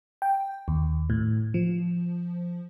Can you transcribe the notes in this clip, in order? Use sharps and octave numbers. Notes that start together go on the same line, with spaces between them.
G5
D#2
A2
F3